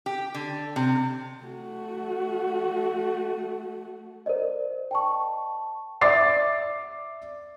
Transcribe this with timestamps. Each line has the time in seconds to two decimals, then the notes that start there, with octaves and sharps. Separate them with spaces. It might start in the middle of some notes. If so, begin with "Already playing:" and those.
0.06 G4
0.34 D3
0.76 C3
1.44 A3 F#4
4.26 A#4 C5 D5 D#5
4.91 G5 A5 C#6
6.01 D5 E5 D6 A6 C7